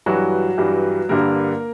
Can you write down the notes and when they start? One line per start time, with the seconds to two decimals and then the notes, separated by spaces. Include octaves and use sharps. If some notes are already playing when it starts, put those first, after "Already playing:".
0.06 G2 E3 F#3 G3 F#4
0.58 G2 E3 G3
1.09 G2 D3 G3 A#3 A#4